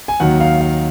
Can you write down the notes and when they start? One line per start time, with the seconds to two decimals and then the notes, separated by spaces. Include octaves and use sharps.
0.08 G#5
0.20 D#2 D#3 F#3 F#5
0.40 F5
0.61 F5